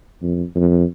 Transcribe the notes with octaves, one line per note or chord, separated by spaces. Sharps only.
F2
F2